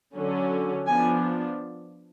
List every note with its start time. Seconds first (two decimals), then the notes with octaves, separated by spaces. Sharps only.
0.15 D3 F#3 C#4
0.86 F3 B3 D4 G#5